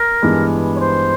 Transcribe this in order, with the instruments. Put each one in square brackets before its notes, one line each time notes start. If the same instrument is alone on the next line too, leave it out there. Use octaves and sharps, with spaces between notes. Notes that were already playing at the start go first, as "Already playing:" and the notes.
Already playing: [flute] A#4
[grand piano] G2 E3 G#3 B3
[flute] C#5
C5